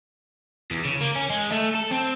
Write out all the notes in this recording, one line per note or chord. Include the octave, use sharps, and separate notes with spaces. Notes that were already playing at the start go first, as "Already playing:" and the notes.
E2
C#3
A#3
C#4
G#3
A3
A4
C4